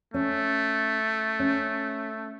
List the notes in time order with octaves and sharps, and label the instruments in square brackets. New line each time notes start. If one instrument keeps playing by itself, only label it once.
[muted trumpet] A3 [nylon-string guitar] C#4
[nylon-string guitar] C#4